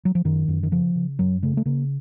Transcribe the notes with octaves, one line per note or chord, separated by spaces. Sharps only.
F#3
F3
F#2 D#3
F#2
D#3
C#3 F3
C#3
F#2 F#3
C#3 A3
A3
C#3 A#3